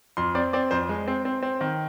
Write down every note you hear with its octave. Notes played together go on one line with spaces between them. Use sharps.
F2 C6
C4 D5
C4 D5
F2 C5
G#3
C4
C4
C4
D#3